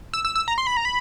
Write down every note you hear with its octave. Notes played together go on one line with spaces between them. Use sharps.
E6
E6
E6
A#5
C6
B5
A#5
B5